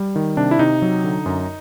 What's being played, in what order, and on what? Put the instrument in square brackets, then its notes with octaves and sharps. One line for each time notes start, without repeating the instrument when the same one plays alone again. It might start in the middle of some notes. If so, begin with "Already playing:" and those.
Already playing: [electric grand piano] G3
D#3
C3 D4
E4
C3 D#4
F#3
D3
F#2